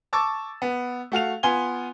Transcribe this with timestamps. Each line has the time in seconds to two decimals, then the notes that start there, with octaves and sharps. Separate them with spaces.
0.13 A5 C#6 D6 E6 A6
0.62 B3
1.12 A3 F#4 F5 F7
1.43 B3 F4 G#5 C6 G7